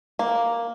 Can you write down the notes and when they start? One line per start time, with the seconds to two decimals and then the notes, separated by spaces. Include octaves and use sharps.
0.19 A#3